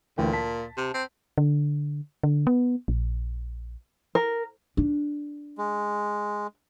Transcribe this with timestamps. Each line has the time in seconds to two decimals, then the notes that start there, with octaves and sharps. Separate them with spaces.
0.18 D2 A#2 E3 G5
0.33 A5 B6
0.77 C3
0.94 C4
1.38 D3
2.23 D3
2.47 B3
2.88 A#1
4.15 A#4
4.77 D4
5.58 G#3